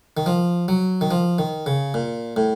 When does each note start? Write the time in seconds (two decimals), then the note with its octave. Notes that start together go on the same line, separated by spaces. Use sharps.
0.17 D#3
0.26 F3
0.68 F#3
1.01 D#3
1.11 F3
1.38 D#3
1.66 C#3
1.94 A#2
2.36 A2